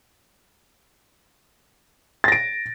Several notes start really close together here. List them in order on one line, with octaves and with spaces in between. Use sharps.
A6 A#6 D7